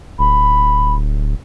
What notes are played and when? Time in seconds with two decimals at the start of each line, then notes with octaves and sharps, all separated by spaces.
0.19 D1 B5